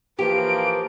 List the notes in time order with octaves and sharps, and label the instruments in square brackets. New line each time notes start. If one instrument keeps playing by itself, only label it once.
[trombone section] E3 F3 A#3 [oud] G4 [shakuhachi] B4 [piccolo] D7